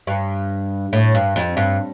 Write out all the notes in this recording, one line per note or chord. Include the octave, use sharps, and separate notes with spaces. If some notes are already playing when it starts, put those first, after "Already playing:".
G2
A2
G2
F2
G2